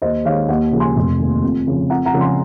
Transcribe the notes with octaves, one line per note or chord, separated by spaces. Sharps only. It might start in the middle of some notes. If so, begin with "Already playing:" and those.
D#2 C5 D#5
D#3 G#3 C#5 F5
D#2 D#5 F#5
C#3 F3 G#3
G#5 C6
F1
D#2 D#3
F2
C#3 F3
F2 F#5 A#5
F#5 A#5
C#3 F3 G#3
G#5 C6